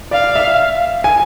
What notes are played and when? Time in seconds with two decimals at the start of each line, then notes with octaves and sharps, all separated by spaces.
0.11 D5 F5
0.36 E5
1.04 G#5